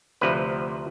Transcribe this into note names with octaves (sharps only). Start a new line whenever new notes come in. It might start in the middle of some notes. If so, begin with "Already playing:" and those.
D2 C3 F3 B4